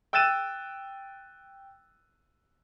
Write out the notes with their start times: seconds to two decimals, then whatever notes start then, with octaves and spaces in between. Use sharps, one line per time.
0.13 G5 E6 F#6 A6 D#7 E7